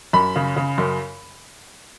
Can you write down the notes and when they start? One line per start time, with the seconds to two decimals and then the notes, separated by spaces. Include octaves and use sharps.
0.13 F#2 B5
0.36 C#3
0.56 C#3
0.78 F#2